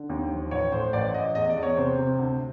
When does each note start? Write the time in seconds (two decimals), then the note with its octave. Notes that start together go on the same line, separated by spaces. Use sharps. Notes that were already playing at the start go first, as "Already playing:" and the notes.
Already playing: D3
0.10 D#2
0.31 F3
0.51 A1 C#5
0.72 A2 C5
0.93 A1 D5
1.14 A1 D#5
1.35 E2 D#5
1.49 D5
1.56 E2
1.63 C#5
1.77 C3 C5
1.98 C3
2.19 D2